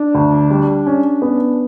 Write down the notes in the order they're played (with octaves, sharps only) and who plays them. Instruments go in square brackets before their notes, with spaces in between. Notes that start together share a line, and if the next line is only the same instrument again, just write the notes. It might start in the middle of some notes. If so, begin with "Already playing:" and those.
Already playing: [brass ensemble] D4
[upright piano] D2
G3
C#4
[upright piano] B3 [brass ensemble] D4